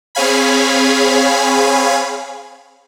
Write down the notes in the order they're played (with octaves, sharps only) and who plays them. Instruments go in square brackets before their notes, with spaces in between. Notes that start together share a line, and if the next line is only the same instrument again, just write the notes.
[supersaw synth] C4 G#4 C#5 F5 G#5 B5